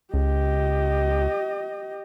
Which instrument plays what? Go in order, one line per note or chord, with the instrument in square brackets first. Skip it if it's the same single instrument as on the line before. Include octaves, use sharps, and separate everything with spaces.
[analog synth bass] C#2 [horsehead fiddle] G4 D#5